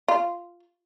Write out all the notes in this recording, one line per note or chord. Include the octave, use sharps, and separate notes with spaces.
F4